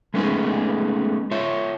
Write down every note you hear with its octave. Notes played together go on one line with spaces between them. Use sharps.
G#3 A3 B3 C#4 D#4 G#4
F4 C#5 E5